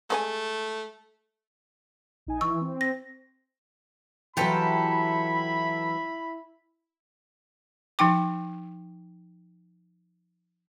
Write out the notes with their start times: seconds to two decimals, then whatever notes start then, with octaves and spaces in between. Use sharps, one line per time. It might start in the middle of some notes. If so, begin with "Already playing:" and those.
0.10 G#3 A3 C5 G#5
2.27 A#1 D#4 G#5
2.41 E3 C#6 E6
2.61 C4
2.81 A#6
4.37 E3 F#3 E4 F4 G4 A4 E5 B5
7.99 F3 D#4 G5 D6